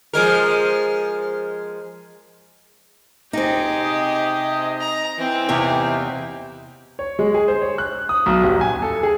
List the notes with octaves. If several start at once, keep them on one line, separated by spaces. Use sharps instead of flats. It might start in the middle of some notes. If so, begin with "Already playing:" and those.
F3 G#3 A#4
C#2 C4 D#4 G4 G#4
C3 C5 D#5
A#5
E3 C4
E2 C3 A#3 D#4 G4 C#5
C#5
G#3
G#4
C5
C#5
F#6
D#6
B1
D#1
G#5
A4
G#4